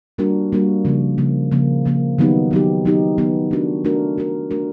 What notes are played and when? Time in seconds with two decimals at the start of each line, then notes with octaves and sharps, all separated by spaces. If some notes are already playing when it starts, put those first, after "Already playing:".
0.18 G3 A#3 D4 F#4 A#4
0.52 G3 A#3 D4 F#4 A#4
0.85 C#3 F3 A#3
1.18 C#3 F3 A#3
1.51 C#3 F3 A#3
1.85 C#3 F3 A#3
2.19 D#3 F#3 B3 D#4 G4
2.51 D#3 F#3 B3 D#4 G4
2.85 D#3 F#3 B3 D#4 G4
3.18 D#3 F#3 B3 D#4 G4
3.51 A3 D4 F#4 A#4
3.85 A3 D4 F#4 A#4
4.18 A3 D4 F#4 A#4
4.51 A3 D4 F#4 A#4